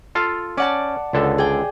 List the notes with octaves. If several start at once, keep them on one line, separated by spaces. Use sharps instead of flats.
F4 A4 F5
C#4 D5 F#5 A5
C#2 D3 A4
G#4 D5 G5